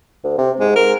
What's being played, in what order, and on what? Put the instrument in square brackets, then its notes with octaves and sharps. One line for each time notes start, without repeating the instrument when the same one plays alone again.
[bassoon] D2
C3
[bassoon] G#2 [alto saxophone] G#3
[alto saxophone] A#4